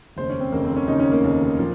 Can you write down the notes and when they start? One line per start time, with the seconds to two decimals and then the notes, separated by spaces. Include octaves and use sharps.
0.17 F1 D#2 C#3 C5
0.30 C#4
0.40 C4
0.52 F1 D#2 C#3 A#3
0.65 C4
0.76 C#4
0.88 F1 D#2 C#3 D#4
0.99 C#4
1.12 A#3
1.24 F1 D#2 C#3
1.59 A#2 F3